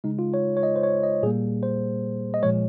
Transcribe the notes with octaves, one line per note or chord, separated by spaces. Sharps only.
C#3 G#3 D#4
F4
C#5
C#5
D#5
C5
C#5
D#5
A#2 G3 A#3 G#4
C5
D#5
A#2 F3 G#3 C#5